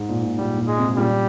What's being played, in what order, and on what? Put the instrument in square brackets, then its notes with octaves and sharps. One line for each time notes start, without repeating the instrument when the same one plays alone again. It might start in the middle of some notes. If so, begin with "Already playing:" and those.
Already playing: [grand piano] G#2
A#2
A#2
[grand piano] A#2 [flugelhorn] G3
[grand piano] A#2
[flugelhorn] G#3
[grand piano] G#2 C3
[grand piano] A#2 C#3 [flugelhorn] G3